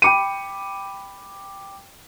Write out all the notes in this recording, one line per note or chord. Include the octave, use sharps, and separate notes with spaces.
G5 B5 D6 C#7 D#7